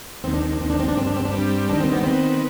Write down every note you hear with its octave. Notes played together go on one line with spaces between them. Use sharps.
D#2 C4
D4
C4
D4
D#2 C4
D4
C4
D4
G2 C4
D4
C4
D4
G3 C4
D#3 D4
C4
B3
B3 C4